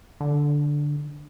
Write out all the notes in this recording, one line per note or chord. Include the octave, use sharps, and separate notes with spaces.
D3